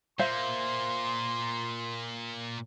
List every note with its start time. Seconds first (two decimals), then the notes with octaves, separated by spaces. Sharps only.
0.19 A#2 A#3 C5 E5 F5 C6